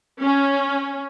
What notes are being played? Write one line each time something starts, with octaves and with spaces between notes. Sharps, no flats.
C#4